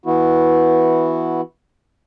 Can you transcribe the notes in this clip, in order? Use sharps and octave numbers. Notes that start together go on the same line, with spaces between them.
E3 B3 E4 F#4